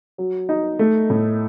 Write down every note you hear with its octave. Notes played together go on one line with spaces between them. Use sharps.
F#3
D#4
A3
A2